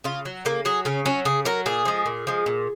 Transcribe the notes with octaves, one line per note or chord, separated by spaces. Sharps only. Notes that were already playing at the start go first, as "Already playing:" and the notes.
C#3 F4
F#3
C#3 A#3
F#3 G#4
C#3 C#4
F#3 C#4
C#3 G#4
F#3 A#4
A#2 G#4
F3 G#3
A#2
F3 G#3
A#2